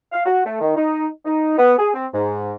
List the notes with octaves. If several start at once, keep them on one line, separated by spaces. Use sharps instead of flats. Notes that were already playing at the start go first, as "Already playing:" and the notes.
F5
F#4
A3
D#3
D#4
D#4
B3
G#4
C4
G#2